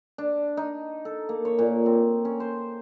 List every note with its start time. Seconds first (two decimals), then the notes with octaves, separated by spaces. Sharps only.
0.18 D4
0.57 D#4
1.05 A4
1.29 A#3
1.45 C#5
1.59 A#2
1.86 C4
2.25 C#4
2.40 C5